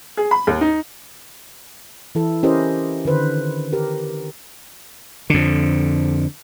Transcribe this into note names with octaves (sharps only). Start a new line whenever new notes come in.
G#4
B5
D#2
D#4
E3 E4 A4
C#4 E4 G4 A#4 C5 D#5
D3 D#3 B4 C5
G4 A#4
F2 D3